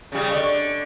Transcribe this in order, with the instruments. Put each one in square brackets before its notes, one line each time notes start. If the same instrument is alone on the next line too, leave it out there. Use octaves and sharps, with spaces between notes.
[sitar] C#3 G3
[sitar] D3 [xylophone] D5 D#5 C#6